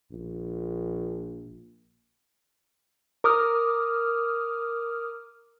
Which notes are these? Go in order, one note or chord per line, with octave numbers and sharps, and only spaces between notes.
A#1
A#4 D6 D#6 F6